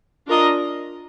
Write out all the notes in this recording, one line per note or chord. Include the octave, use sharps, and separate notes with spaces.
D4 F4 A#4 D#5